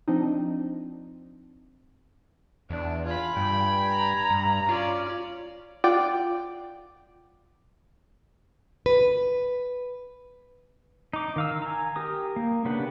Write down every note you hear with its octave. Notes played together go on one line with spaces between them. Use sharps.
F3 C4 D4 D#4
E2 D4
F4 G#5 B5
G2 G5
A#5
G2
C#4 F4 D5
F4 D5 F#5 G5 D6
B4
D#4 D6
D#3 F5 E6
G#5 A#5
G4 A#4 D#6
A#3
C#3 B3 D4 G4 F#5